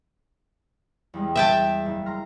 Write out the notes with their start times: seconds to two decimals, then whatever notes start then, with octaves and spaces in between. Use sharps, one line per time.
1.14 E2 G3 G#3
1.35 E5 G5 A5
1.86 F#1
2.06 A#5 C6 F6